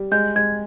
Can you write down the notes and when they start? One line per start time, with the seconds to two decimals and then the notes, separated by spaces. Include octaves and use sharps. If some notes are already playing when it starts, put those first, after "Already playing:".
Already playing: G3
0.11 G#3 G6
0.36 G#3 G#6